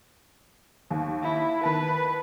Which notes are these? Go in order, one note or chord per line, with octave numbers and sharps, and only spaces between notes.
D#2
E4
D#3 B4 A5